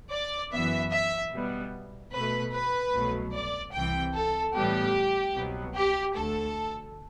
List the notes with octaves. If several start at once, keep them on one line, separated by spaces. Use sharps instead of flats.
D5
F#2 E3 B3 E5
E5
B2 G3 B3
B2 A3 B4
B4
C2 B2 F#3 A3
D5
C2 C3 E3 G5
A4
A2 E3 G3 B3 G4
C2 B2 F#3 B3
G4
D2 D3 A3 A4